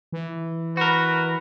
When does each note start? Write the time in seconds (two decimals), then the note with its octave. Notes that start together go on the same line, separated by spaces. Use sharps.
0.12 E3
0.77 F#4 A#4 B4